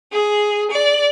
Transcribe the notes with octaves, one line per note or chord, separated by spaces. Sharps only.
G#4
D5